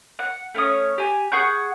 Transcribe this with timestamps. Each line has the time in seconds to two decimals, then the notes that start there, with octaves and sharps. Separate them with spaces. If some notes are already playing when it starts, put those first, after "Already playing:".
0.19 F#5
0.55 A3 C#4 C#5 D#6
0.98 G4 G#5
1.32 G#4 F#5 C#6 G6